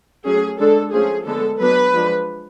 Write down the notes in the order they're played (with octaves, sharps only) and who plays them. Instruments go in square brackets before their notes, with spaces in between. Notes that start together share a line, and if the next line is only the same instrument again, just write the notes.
[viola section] F#3 A3 C#4 G#4
D3 G#3 D4 A4
F3 A3 C#4 G#4
D3 G#3 B3 A4
F#3 B3 D4 B4
F3 G#3 D4